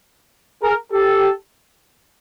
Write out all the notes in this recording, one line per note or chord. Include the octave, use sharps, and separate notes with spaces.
G#4 A#4
G4 A4